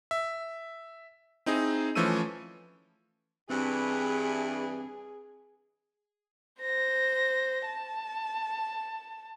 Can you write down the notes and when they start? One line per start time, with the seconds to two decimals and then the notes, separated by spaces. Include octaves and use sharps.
0.11 E5
1.46 C4 D#4 E4 G#4
1.95 E3 F3 A3 C#4 E6 D#7
3.50 G2 E3 C4 G#4
6.62 C5 A#6
7.67 A5